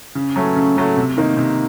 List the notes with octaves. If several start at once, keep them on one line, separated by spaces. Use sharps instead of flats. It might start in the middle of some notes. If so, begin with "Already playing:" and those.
C#3
F#3 A3 C#4
C#3
F#3 A3 C#4
C3
D#3 A#3 D#4
C3